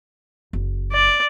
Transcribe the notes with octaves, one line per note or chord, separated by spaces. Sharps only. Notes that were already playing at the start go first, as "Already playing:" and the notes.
F#1
D5